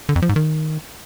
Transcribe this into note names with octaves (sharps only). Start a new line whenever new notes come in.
D3
F2
F3
G#2
D#3